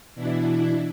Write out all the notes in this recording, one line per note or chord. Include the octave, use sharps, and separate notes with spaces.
B2 E3 D4 E4